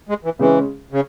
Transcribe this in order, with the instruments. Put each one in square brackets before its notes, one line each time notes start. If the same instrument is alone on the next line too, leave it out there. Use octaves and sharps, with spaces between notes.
[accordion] G#3
E3
[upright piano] C#3 G#3 C#4 [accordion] E3
[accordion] C#3